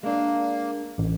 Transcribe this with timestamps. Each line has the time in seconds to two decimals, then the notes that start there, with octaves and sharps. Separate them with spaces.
0.03 G#3 A#3 D4
0.98 A1